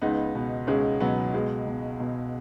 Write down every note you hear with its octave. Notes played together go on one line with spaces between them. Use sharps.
C#2 B3 D#4
B2
C#2 G#3 C#4
B2 F#3 B3
B2 G#3
B2
B2